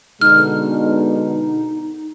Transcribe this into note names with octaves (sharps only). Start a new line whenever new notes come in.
B2 D3 G#3 D#4 F6